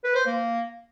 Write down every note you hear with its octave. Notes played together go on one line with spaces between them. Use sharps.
B4
C5
A#3